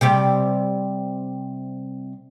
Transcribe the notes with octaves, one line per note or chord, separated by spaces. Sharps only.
C3 G3 G4